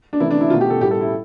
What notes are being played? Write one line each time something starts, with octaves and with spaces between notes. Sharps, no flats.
D4
C3 E3 A3 E4
D4
E4
B2 A3 F4
G4
A4
A2 G3 G4
A4
E4